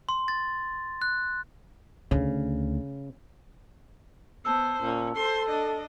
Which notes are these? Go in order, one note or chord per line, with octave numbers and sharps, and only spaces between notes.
C6
A6
F#6
D2 C#3
B3 C5 A5 E6
A#2 C#4
A4 C5 C6
D4 D#5